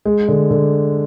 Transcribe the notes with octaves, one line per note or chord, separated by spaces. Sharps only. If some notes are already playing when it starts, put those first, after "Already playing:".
G#3
D3
D3